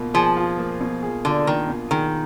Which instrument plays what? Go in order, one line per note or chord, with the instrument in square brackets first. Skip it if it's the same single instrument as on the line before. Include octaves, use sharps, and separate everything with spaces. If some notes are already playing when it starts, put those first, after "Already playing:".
Already playing: [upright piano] B2 A#3 F4
[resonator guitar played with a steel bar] F3 [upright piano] G#4
[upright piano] F4
A#3
B2
G#4
[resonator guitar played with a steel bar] D3 [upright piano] F4
[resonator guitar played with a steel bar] D#3 [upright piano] A#3
[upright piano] B2
[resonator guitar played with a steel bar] D#3 [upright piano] G#4